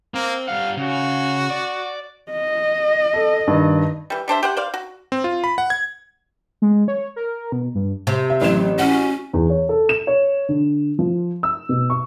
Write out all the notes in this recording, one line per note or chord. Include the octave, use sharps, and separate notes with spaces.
A#3 C4
G3 F5 F#5
C#3 F#4
D5
D#5
A4
G2 D#3
E3 G3
G3 D4 C5 E5
G4 C5 F#5
C5 D5 F5
F#4
C4
F4
B5
F#5
G#6
G#3
C#5
A#4
B2
G2
C3
E5
A1 F#3 E7
C#4 F#4
E2
C#5
A4
E7
C#5
D3
F3
E6
B2
C#6